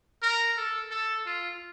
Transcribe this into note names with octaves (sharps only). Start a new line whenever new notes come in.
A#4
A4
A4
F4